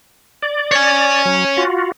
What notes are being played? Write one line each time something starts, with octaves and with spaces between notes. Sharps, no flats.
D5
C#5 G#5
F#3
F4 F#4